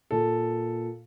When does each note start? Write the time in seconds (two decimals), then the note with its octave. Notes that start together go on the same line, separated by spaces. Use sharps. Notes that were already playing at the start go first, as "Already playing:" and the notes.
0.11 A#2 A4